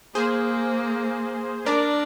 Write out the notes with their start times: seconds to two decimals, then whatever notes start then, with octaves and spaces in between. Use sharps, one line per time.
0.15 A#3 G#4 C5
1.65 D4 A#4 D5